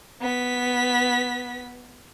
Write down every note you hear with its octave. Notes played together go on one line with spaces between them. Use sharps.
B3 B6